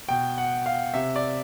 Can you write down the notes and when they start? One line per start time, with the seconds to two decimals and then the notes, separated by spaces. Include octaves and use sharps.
0.09 B2 G5
0.38 F#5
0.66 F5
0.94 C3 E5
1.16 D5